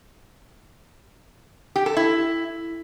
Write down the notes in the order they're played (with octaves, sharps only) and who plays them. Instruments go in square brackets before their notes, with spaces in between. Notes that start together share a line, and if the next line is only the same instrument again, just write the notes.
[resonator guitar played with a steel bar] G4
A4
E4